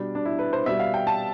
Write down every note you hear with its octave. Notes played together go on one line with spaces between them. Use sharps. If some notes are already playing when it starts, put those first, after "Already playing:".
Already playing: B2 G3 D4
D4
E4
B4
C5
B2 G3 E5
F5
G5
A5